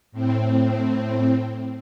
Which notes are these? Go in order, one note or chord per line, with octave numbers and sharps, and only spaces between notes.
A2 C4